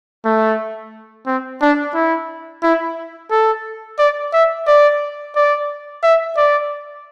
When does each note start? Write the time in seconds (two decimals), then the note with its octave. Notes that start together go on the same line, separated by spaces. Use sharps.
0.25 A3
1.27 C4
1.62 D4
1.94 E4
2.63 E4
3.31 A4
3.99 D5
4.33 E5
4.67 D5
5.36 D5
6.03 E5
6.37 D5